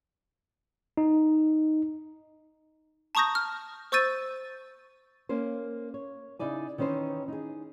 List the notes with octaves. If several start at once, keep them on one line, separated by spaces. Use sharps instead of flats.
D#4
A5 A#5 C#6 D#6 G6 A#6
F6
C5 C#6 E6 G6 A6 D#7
A#3 C#4 C5
C#5
C#3 D#4 E4 D5 G#5
D#3 E3 C#4 D#4 C5
D#4 G#4